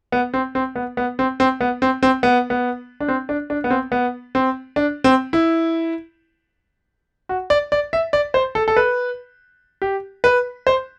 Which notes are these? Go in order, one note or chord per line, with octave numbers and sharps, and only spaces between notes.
B3
C4
C4
B3
B3
C4
C4
B3
C4
C4
B3
B3
D4
C4
D4
D4
B3
C4
B3
C4
D4
C4
E4
F#4
D5
D5
E5
D5
C5
A4
A4
B4
G4
B4
C5